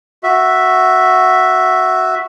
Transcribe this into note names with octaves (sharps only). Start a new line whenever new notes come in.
F#4 E5